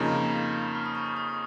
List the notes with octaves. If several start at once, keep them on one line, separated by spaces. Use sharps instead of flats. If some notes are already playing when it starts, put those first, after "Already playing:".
Already playing: F2 C#3 A#3 D#4
F6
D#6
C#6
D#6
D#6